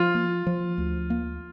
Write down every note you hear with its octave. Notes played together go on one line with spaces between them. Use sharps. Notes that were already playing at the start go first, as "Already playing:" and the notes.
Already playing: F3 F4
A#3
F3
D2
A#3